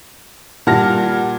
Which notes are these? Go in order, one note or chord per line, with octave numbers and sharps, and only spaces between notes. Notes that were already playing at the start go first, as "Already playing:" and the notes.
A#2 G3 F#5 A5 F6 A#6